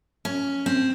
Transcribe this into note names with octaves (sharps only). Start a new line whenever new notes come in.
C#4
C4